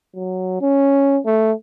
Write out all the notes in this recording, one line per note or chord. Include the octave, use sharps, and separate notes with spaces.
F#3
C#4
A3